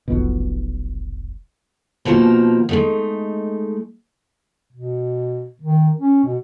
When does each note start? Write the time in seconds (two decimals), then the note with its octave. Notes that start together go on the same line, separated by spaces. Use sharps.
0.08 F1 B1 F2 B2
2.05 B2 F3 A#3 D#4 A5
2.69 G#3 A3 D#4
4.73 B2
5.62 D#3
6.00 C#4
6.24 B2